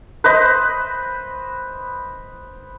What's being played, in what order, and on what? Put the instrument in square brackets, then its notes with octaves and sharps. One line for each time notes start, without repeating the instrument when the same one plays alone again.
[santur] B4 C5 D#5